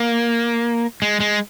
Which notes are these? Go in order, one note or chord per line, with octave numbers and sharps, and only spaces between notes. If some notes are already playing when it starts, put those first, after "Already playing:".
Already playing: A#3
G#3
G#3